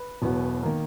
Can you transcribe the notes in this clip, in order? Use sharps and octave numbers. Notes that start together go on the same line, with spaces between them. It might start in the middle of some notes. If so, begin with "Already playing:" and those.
Already playing: B4
E1 E2 B2 F#3 B3
D#3 A#3